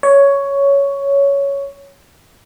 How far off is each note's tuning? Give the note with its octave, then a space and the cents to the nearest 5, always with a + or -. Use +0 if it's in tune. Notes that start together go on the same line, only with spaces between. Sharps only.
C#5 +10